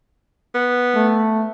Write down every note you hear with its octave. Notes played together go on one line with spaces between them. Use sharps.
B3
A3